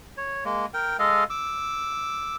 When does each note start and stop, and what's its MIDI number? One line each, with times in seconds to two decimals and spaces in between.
0.17 0.44 73
0.45 0.66 56
0.45 0.66 58
0.74 0.97 70
0.74 0.97 79
0.99 1.24 56
0.99 1.24 69
0.99 1.24 75
0.99 1.24 77
1.30 2.36 86
1.30 2.36 88